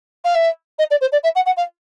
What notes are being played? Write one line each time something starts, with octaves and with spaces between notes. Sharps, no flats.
F5
E5
D#5
D5
C5
D5
E5
F#5
F#5
F5